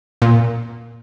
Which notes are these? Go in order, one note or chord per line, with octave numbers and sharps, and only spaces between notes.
A#2